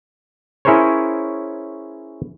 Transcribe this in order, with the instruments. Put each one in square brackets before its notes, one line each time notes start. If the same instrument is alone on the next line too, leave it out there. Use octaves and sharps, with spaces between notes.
[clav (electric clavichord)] C#4 E4 G#4 A#4 C5 C#5